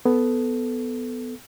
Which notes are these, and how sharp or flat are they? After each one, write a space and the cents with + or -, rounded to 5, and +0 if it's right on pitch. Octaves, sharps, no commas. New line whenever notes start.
B3 +10 A4 -5